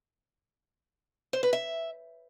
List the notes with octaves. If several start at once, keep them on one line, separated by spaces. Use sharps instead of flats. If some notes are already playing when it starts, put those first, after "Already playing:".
C5
B4
E5